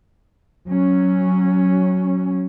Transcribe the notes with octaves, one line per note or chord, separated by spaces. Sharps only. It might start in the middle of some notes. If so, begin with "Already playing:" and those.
F#3 C#4